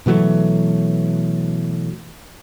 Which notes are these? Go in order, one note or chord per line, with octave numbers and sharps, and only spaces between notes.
B2 E3 F#3 A3